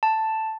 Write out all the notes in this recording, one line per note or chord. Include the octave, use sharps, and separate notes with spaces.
A5